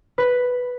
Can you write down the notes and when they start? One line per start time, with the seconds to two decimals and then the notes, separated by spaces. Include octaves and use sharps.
0.18 B4